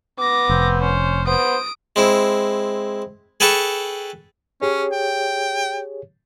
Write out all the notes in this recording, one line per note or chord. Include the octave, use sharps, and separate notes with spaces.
B3 D6 A#6
F1 C4
C#4 C5
B3 C5 D#6 D7
G#3 C4 E4
G#4 A4 B4 G5 A5 C#6
C#4 G4 G#4 C#5
G5